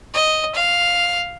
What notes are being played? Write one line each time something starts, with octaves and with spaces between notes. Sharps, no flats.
D#5
F5